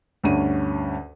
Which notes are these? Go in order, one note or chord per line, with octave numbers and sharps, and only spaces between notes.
D2 G2 C#4 D#7